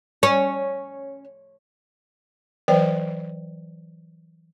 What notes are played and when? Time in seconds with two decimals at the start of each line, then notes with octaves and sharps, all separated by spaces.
0.23 C#4
2.68 E3 F#3 B4 C5 D5 G5